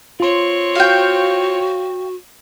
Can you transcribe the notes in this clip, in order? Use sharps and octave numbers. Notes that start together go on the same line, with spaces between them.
C4 F4 C#5 C6
F#4 F5 G5